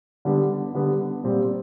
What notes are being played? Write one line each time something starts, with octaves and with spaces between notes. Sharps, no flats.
D3 G3 B3
D3 G3 B3
A#2 G3 C4